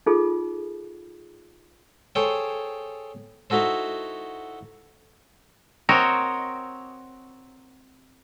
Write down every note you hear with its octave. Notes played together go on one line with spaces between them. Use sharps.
D#4 F4 G#4 A4
G#4 A4 C5 C#5 G5
D#4 E4 F#4 A4 C5
C4 F#4 A#4 C#5 D#5